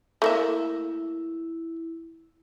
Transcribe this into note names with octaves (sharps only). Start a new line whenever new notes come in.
A3 A#3 E4 E5